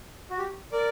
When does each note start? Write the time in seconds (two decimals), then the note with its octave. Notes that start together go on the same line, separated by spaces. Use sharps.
0.30 F#4
0.38 G4
0.72 A#4 D5